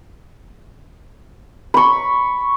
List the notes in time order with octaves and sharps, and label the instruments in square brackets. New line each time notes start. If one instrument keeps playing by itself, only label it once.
[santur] B5 C#6